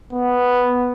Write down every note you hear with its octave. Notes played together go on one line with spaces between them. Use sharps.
B3